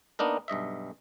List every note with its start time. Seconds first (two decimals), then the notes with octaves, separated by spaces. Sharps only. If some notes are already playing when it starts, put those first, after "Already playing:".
0.19 A#3 B3 D4 D#4 A#4
0.48 B1 G2 D#5 E5